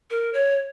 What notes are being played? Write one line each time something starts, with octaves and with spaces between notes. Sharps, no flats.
A#4
C#5